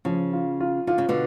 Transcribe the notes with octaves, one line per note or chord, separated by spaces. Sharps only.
C#3 F3
F4
F4
D3 F4
C#3
B2 D3